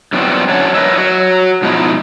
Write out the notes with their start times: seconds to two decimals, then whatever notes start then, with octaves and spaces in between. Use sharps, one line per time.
0.13 F#2 E3 G3 B3 C4 F#4
0.49 F#2 D3 C#5 F#5 G#5 A5
0.75 A#4 B4 C#5 D#5 E5
0.97 F#3 F#4
1.62 G#2 B2 F3 D#4 E4